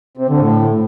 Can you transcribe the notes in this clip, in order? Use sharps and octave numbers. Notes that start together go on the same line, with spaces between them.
C3
D3
A2